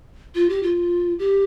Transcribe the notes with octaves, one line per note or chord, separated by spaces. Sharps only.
F4
G4
F4
G4